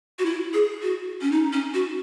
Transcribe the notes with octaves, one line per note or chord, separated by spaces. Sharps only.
F#4
E4
G#4
F#4
C#4
D#4
C#4
F#4